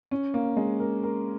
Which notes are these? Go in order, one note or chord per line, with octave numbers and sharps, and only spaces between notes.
C#4
A#3
G#3
A#4
A#4